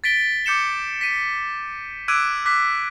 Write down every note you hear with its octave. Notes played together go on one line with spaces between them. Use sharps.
A6 B6 D7 G7
D6 G6 C#7 E7 G7
B6 D#7
D6 E6 F#6 G#6 D7 D#7
D6 F#6 B6